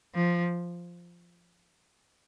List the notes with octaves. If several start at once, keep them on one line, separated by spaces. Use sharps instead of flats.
F3